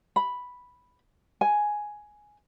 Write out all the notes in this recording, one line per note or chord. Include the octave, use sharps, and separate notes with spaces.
B5
G#5